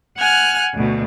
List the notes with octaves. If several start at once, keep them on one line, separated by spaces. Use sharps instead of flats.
F#5 G#5 F6 F#6
D2 B2